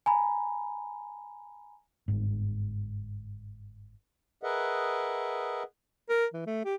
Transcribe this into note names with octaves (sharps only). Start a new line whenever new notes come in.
G#5 A#5 B5
G1 G#2
G#4 A#4 B4 D#5 E5 F#5
A#4
E3
A3
G4